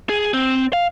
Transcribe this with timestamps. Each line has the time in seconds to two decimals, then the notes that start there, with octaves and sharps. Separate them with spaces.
0.09 G#4
0.34 C4
0.73 F5